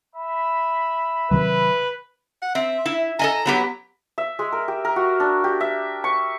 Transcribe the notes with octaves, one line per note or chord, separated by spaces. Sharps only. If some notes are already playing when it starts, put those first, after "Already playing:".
E5 B5
C3 D#3 F#3 B4
F#5
C4 E5
E4
A4 D#5 G#5 A#5
F#3 B3 G4
E5
G#3
A#4
G4
A#4
F#4
D4
G4
E5
C#6